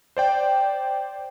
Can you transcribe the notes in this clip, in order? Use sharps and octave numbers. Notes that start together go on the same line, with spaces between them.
C5 D5 G5